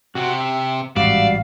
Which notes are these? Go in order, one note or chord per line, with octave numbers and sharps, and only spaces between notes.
C3 F#4
E5
A1 G#2 G3 F#4 D5 E5 F5